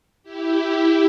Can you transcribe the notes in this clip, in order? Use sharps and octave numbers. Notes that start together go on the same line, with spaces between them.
E4 G4